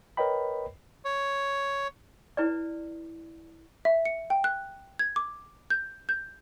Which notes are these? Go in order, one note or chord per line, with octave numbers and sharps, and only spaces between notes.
A#4 B4 C#5 D#5 G5 B5
C#5
E4 B4 D5
E5
C#7
G5
F#6
G#6
D6
G6
G6